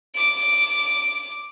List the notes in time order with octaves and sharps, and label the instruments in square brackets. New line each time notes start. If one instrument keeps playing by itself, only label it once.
[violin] D6 D7